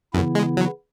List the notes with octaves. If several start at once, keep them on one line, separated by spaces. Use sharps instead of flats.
F#2 C#3 E3 B3 E4
G#3
F#3